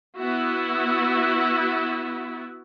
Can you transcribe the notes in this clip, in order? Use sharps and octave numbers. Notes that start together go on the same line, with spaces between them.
B3 E4 F#4